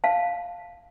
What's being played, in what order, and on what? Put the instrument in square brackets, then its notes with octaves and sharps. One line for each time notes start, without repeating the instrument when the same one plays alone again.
[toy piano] F5 A5